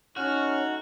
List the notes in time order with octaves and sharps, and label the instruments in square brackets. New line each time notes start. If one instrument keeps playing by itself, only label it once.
[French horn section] A3 D#4 [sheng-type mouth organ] C#4 F6 [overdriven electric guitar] F#4